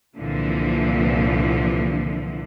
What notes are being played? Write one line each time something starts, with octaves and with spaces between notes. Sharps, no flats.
C2 A#2 D3 E3 F3